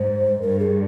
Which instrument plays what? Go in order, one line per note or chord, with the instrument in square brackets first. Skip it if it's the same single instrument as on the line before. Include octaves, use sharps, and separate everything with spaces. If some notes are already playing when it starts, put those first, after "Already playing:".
Already playing: [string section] G#2 [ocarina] C5
[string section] G2 [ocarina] A#4
[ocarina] G#4